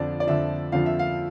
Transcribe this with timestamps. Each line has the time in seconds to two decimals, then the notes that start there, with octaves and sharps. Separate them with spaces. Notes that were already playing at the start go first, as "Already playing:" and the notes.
Already playing: F2 D3 F3 D5
0.20 D5
0.27 F2 D3 F3 E5
0.72 F2 D3 F3 F5
0.86 E5
0.99 F5